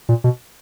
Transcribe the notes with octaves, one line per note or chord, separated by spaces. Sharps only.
A#2
B2